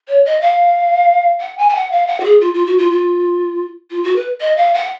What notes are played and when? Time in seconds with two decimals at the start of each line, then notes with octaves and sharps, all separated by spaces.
0.08 C#5
0.25 D#5
0.41 F5
1.41 F#5
1.58 G#5
1.69 G#5
1.75 F#5
1.92 F5
2.07 F#5
2.20 F#4
2.25 G#4
2.40 F4
2.54 F4
2.66 F#4
2.78 F4
2.91 F4
3.91 F4
4.04 F#4
4.16 B4
4.41 D#5
4.57 F5
4.74 F#5